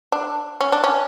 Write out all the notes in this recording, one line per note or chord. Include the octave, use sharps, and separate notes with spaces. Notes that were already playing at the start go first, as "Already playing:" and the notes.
D4
C#4
D4
C#4